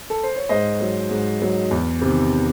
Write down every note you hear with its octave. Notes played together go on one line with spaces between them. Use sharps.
A4
C5
C#5
G#2 C5 D#5
F#3
G#2
F#3
E2
C3 D#3